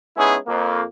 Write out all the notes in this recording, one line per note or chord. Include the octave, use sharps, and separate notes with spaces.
G#3 B3 C#4 D#4 E4 G#4
F2 A#3